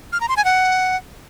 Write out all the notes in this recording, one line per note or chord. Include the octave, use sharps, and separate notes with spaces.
F6
A#5
C6
G#5
F#5